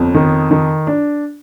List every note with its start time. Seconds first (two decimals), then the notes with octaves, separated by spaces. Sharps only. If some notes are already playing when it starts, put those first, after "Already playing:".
Already playing: G1 F2
0.15 D#3
0.51 D#3
0.87 D4